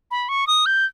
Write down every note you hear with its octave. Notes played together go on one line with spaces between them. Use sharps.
B5
C#6
D#6
G6